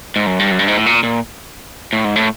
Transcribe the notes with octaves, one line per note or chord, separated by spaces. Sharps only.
G#2
F#2
G2
F#2
G2
G#2
A2
A#2
A#2
A2
G#2
A2